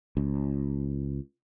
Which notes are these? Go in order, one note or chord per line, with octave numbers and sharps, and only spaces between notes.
C#2